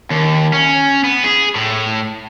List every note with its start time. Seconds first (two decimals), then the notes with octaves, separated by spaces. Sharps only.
0.11 D#2
0.53 C#4
1.04 B3
1.24 G#4
1.56 A2